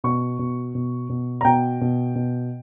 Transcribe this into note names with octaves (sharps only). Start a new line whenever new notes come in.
B2 C#6
B2
B2
B2
A#5
B2 G5
B2
B2